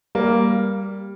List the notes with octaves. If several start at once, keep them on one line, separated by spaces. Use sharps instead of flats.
G3 A#3